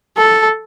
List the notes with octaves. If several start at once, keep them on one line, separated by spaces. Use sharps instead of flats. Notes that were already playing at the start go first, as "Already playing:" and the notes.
A4